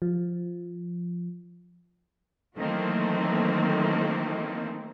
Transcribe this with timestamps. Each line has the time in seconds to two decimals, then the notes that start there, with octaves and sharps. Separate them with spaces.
0.02 F3
2.58 D#3 E3 F#3 A3 A#3 C4